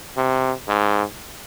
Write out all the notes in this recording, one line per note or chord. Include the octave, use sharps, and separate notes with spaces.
C3
G#2